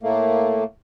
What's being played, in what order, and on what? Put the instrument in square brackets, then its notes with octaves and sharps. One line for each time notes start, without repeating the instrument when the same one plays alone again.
[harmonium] A2 A3 A#3